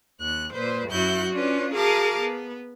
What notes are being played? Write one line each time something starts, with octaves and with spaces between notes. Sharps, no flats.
D#2 F#6
A#2 B4 C5
F#2 E4 F#4 F#6 G6
C#4 D4 F4 B4
F#4 G#4 A#4 F5 A5 D6
B3